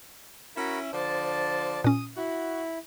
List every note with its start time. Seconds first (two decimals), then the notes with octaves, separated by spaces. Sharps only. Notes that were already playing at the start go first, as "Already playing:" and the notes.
0.57 C#4 E4 F#4 A#4 B5
0.93 D3 F3 C5 D5 A5
1.84 A#2 C#4 D#6
2.17 E4 F#4